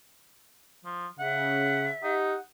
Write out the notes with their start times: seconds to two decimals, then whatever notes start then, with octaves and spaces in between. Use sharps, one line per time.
0.85 F3
1.19 C#3 E5 F#5
2.04 D#4 G4 F#5